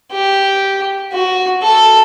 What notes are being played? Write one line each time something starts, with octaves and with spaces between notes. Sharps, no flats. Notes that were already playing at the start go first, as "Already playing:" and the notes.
G4
F#4
A4